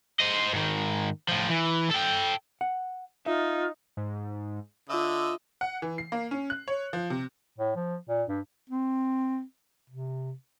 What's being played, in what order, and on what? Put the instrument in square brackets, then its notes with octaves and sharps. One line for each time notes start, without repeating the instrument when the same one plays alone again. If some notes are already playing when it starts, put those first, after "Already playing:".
[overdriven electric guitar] C5 D#5
G#2 D#3
A2 F3
E3
A4 G5
[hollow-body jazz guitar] F#5
[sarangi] D#4 [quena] F4 [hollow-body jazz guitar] E5
[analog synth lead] G#2
[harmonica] D3 D#5 [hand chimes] F4 E5 [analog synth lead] E6
[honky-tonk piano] F#5
E3
C7
A#3
C#4
F#6
C#5
F3
C3
[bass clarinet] A2
F3
A#2
G2
C4
C3